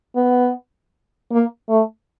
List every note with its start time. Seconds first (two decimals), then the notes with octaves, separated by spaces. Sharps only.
0.16 B3
1.31 A#3
1.69 A3